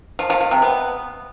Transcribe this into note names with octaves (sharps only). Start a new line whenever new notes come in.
F3
F3
F3
C3
B3